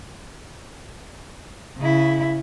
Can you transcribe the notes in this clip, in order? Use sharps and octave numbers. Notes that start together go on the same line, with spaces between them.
C#3 E4